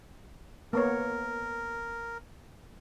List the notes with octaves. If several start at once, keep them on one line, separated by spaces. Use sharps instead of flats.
A#3 B3 A#4 C#5